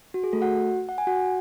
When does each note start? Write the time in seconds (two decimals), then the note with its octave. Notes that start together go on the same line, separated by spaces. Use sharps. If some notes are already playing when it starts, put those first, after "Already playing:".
0.14 F#4
0.24 G#4
0.33 A3 A4
0.42 F#4 F#5
0.89 F#5
0.98 G#5
1.07 F#4 F#5